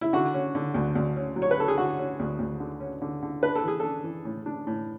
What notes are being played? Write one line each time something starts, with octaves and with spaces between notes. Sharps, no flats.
E4
D3 F#4
C#4
D3
D2
D2
C#4
F#3
C#5
B4
C#4 A4
G#4
D3 F#4
C#4
D2
D2
D3
C#4
D3
D3
D4 B4
A4
E3 G#4
D4 A4
E3
A2
D4
A2